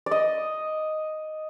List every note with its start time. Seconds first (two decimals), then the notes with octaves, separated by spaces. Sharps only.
0.06 D5
0.11 D#5